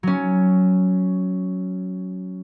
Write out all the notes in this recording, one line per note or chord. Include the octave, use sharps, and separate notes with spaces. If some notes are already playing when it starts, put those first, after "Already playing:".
F#3 C#4